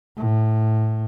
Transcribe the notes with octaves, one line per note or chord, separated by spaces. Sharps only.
A2